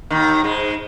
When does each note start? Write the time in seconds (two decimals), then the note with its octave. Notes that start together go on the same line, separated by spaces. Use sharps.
0.10 D#2 D#3
0.44 G#2 G#3